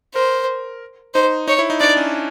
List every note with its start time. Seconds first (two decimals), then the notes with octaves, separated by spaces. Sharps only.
0.15 A#4 C5
1.14 D#4 C5
1.48 D#4 C#5
1.59 E4
1.70 D#4
1.80 D4 D5
1.97 C#4